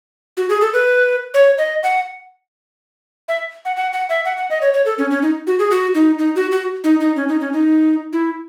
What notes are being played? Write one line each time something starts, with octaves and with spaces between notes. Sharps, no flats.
F#4
G#4
A4
B4
C#5
D#5
F#5
E5
F#5
F#5
F#5
E5
F#5
F#5
D#5
C#5
C#5
A4
C#4
C#4
D#4
F#4
G#4
F#4
D#4
D#4
F#4
F#4
D#4
D#4
C#4
D#4
C#4
D#4
E4